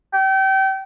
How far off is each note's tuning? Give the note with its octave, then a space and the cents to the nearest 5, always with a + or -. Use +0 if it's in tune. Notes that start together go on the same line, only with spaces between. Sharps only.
G5 -30